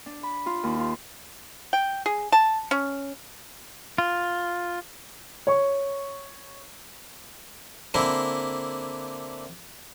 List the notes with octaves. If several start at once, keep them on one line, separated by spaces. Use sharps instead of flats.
D4
B5
F4
D#2
F4
G5
G#4
A5
C#4
F4
C#5 C#6
D3 A#3 C4 E4